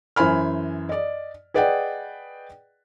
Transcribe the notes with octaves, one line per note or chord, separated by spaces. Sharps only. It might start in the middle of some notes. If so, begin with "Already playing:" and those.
F#2 E3 C5 G#5 B5 F6
D5 D#5
G#4 B4 D5 D#5 F#5 G5